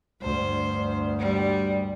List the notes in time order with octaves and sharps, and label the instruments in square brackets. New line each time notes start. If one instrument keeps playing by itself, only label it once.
[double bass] D2 G2 [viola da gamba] C5
[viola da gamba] G3